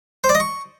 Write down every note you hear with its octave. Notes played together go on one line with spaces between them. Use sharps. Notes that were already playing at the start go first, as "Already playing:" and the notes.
C5
D5
D#5
C#6